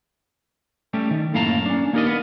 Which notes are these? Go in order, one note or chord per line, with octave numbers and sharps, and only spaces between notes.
G3 A3 C#4 G4
D#3
F#2 A2 A#3 F5 A5 A#5
C#4 D4
A#3 D#4 G4 A#4 D5 D#5
B3